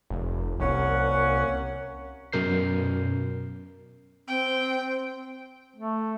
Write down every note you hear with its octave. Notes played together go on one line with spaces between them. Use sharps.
F1
C2 A#3 C#4 F#5
F#2 B2 A#4 G6 C7
C4 G5
A3